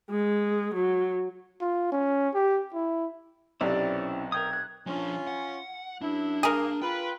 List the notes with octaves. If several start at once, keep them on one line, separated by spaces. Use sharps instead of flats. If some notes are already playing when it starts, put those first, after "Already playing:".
G#3
F#3
F4
C#4
G4
E4
B1 C3 C4 C#4 E4 D5
A#4 G5 D#6 G#6
F#6
F3 C#4 D4 F4
F#5
F#2 D4 E4
G2 A#3 G#4 A#4
F4 B4 G5